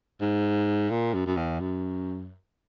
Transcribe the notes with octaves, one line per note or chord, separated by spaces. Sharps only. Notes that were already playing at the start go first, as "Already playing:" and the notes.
G#2
A#2
F#2
F#2
E2
F#2